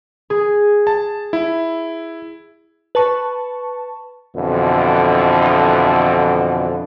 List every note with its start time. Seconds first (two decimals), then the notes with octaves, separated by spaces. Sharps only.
0.30 G#4
0.87 A5
1.33 E4
2.95 B4 A5 C#6
4.36 F2 B2 D3 E3